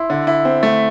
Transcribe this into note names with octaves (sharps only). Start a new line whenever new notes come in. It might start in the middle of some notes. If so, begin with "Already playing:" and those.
Already playing: E4 C6
D3
E4
C4
A3